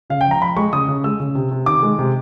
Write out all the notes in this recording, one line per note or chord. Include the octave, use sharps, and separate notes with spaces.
C#3 F5
G5
F3
A#5
F3 B5
G#3 C#6
C#3 D#6
C#3
G#3 E6
C#3
C3
C3
D#3 D6
G#3
C3